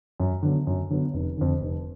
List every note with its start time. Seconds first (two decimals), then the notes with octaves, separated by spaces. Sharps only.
0.20 F#2
0.43 D3 F#3 B3
0.67 F#2
0.90 D3 F#3 B3
1.14 F1
1.37 F2 D3
1.61 F1